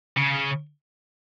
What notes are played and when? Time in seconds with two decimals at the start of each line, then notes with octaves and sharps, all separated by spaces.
0.17 C#3